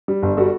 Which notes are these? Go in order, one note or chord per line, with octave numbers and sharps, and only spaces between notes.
G3
G1
G3 F#4 A4